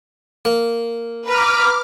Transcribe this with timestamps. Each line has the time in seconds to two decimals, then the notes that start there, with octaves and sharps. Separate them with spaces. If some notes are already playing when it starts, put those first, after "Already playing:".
0.45 A#3
1.27 B4 A#5 D6 F6